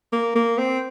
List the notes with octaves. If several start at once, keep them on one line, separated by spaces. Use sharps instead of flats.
A#3
A#3
C4